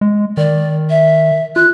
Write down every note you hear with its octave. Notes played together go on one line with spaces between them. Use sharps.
G#3
D#3 D5
E5
F4 F#6